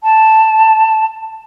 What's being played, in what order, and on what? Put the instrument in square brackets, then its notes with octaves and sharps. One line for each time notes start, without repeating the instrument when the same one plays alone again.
[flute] A5